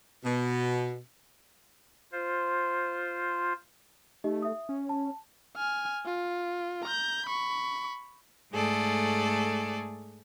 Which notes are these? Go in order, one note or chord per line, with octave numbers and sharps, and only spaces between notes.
B2
F4 C5
A3 D#4 G4 D#5
E5 D#6
C#4
A5
G#5 F6
F4
A#5 G6
B5 C#6
G#2 A3 G#4 A4 D5